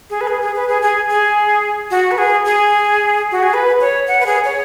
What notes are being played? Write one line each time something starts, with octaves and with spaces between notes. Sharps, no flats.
G#4
B4
G#4
G#4
B4
G#4
G#4
G#4
F#4
B4
G#4
G#4
F#4
G#4
B4
C#5
F#5
B4
G#4
C#5